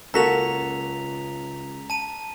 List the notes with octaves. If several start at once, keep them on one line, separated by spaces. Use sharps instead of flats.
C#2 A#3 F#4 A4 A#4 A#5 B6 F7
A5 D#7